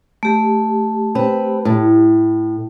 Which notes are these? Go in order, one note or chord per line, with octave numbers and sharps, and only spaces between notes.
A3 G4
C4 B4
A2